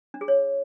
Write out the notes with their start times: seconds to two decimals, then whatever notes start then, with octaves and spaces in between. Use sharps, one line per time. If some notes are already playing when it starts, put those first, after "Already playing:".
0.14 D4
0.21 G#4
0.28 C#5